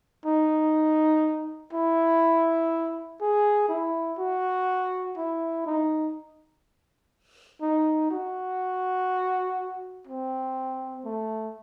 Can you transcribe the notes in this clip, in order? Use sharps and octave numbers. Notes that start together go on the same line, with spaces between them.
D#4
E4
G#4
E4
F#4
E4
D#4
D#4
F#4
C4
A3